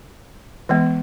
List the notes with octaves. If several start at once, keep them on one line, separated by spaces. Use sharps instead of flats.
E3 G#3 B3